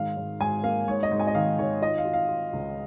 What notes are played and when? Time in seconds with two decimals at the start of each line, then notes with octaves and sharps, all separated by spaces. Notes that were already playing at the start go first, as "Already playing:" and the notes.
Already playing: G#2 D#3 F5
0.17 G#2
0.40 G#2 G#5
0.63 A#3 F5
0.88 G#2 C#5
1.03 D#5
1.11 G#2
1.20 G#5
1.27 D#5
1.35 D#3 F5
1.58 D#3 C#5
1.82 F4 D#5
1.98 F5
2.05 F4
2.13 F5
2.29 F4
2.53 C#2